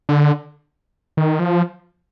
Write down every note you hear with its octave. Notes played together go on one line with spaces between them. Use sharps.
D3
D#3
F3